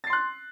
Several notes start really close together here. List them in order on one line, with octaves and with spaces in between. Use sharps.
A6 C7 C6 F#6